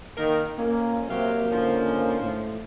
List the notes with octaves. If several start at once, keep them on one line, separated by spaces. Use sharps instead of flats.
D#3 A#3 A#4
F2 A#3 C#4
C3 F#3 A#3 G4 F5
G#2 D3 F3 C#4
A2